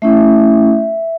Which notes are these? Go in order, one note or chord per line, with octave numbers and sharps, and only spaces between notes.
A3 C#4 E4 E5